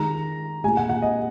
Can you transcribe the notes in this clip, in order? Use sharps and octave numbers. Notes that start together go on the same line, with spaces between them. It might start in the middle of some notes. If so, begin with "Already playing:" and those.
Already playing: D#3 G#3 A#5
A#2 G#3 G#5
F#5
F#5
D#5